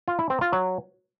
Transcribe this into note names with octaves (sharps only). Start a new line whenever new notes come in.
F4
E4
C4
F4
F#3